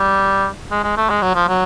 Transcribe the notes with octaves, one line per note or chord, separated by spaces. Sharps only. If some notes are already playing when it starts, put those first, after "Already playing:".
Already playing: G3
G#3
G#3
A3
G#3
F#3
F3
F#3